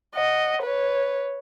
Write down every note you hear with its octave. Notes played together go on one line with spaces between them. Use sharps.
D#5 F#5
B4 C#5